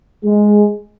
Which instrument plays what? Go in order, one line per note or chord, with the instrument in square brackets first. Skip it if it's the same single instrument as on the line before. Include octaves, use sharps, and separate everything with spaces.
[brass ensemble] G#3